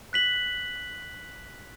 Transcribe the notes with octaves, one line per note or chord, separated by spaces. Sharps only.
F#6 B6 F#7